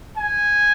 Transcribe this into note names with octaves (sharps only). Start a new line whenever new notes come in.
G#5